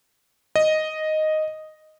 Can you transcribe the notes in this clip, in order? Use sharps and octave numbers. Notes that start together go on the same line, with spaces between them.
D#5